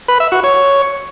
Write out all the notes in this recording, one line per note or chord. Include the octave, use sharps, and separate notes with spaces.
B4
E5
F#4
C#5